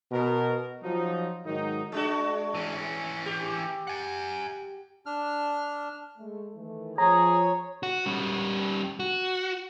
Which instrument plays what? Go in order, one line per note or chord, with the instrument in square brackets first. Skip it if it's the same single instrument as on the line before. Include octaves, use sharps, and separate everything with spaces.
[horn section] B2 A#4
F3 F#3 D#4
G#2 D#3 F#3 D#4
[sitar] G#3 D4 F#4
[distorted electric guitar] E3 C#4
[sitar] G4
[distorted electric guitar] F#5 G#5
[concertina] D4 F6
[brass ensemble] G#3 A3
D#3 E3 A3
[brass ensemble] F3 [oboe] G#4 [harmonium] C#5 [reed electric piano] A#5
[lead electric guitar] F#4
G3 C#4
F#4